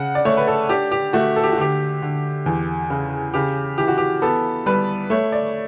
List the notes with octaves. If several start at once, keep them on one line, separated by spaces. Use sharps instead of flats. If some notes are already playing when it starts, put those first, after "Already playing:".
Already playing: C#3 F#5
D5
A3 C#5
B4
A4
D4 G4
G4
A3 F#4
A4
G4
F#4
D3 G4
D3
E2
C#3
C#3 G4
E3 G4
F#4
G4
B3 A4
G3 B4
A3 C#5
D5